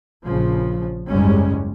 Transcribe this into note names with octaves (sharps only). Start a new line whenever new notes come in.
A#1 C#3 F3
F#1 D#2 G#2 G3 G#3 C#4